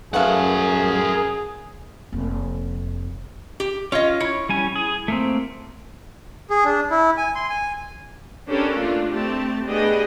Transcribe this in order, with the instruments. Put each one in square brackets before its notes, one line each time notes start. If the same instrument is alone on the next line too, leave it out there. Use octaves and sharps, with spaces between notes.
[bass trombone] F#2 [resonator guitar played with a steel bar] A3 B4 F5 [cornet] G#4 [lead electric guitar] A#4 F#5
[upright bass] F1 A#3
[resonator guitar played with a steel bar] G4
[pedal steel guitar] C#4 F4 [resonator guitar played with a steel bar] C#5 D#5
[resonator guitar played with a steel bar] E4 [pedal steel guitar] C#5
[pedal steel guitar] G3 C#4 G#5
G#4
A3 A#3 C4
[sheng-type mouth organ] G#4
D4
E4
G#5
C6
G#5
[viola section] B3 C#4 D4 G4 A4 A#4
A3 A#3 D4 F4
A3 C4 G4 A5
A3 B3 D4 G4 G#4 D#5